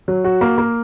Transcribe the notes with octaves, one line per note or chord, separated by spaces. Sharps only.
F#3
F#4
A#3
A#3